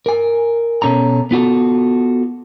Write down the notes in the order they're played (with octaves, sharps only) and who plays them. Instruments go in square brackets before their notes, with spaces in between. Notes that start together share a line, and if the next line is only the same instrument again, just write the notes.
[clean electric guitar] A#4 G#5
B2 C#4 A4 A#5
B3 F4 F#4 A4